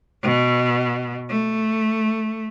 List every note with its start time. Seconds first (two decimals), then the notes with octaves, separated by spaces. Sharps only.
0.23 B2
1.29 A3